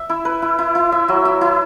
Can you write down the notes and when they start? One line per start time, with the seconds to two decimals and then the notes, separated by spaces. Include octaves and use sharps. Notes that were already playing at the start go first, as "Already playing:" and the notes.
Already playing: E5
0.09 E4
0.25 B4
0.42 E4
0.59 E4
0.75 E4
0.92 E5
1.08 F#3
1.25 E5
1.41 E4